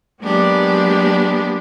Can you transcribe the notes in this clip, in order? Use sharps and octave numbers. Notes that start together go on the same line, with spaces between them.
F#3 G#3 A#3 B3 D4 G4